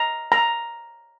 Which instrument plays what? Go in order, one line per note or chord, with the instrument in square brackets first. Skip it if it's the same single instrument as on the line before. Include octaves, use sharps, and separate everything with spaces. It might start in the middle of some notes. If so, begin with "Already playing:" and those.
Already playing: [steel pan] A#5
A#5